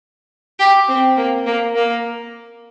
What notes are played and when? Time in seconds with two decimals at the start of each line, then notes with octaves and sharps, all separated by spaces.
0.59 G4
0.88 C4
1.17 A#3
1.46 A#3
1.75 A#3